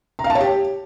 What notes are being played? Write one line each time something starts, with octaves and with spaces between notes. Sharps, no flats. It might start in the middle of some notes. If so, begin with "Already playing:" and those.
A#5
F5
A5
C#5
G4